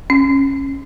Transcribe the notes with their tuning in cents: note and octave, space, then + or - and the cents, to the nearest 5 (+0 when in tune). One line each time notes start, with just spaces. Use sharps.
C#4 -15